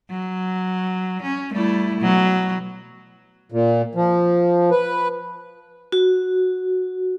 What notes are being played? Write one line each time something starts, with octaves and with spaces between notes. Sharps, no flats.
F#3
C#4
G3 A3 E4
B2 F#3
A#2
F3
B4
F#4